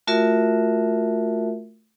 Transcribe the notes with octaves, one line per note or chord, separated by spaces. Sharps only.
A3 F4 F#4 A#4 E5